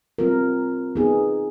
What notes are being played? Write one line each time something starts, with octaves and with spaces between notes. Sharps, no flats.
G3 C4 F4 A#4
B3 D#4 G#4